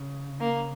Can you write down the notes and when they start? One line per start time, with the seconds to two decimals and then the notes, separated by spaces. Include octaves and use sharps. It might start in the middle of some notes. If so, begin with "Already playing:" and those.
Already playing: C#3
0.40 A#3